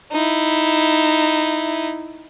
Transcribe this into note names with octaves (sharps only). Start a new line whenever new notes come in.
D#4 E4